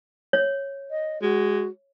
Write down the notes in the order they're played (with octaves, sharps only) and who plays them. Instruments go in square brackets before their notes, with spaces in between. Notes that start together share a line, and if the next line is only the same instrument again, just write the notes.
[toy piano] C#5
[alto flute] D#5
[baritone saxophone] G#3 [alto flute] F#4